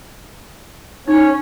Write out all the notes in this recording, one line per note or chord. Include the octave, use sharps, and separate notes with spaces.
C#4 D#4 C#5